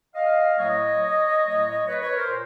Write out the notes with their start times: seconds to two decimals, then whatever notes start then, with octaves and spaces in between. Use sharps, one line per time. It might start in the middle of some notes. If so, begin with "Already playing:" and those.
0.15 D#5 F5
0.58 A2 F#3 A3 C#5 D#5
1.45 A2 F#3 A3
1.88 B4 C#5
2.02 B4 C#5
2.16 A#4 C5
2.30 A#2